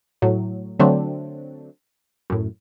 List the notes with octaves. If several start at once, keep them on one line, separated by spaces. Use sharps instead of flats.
A2 F#3
D3 F#3 A3 C4 D4
F#2 A2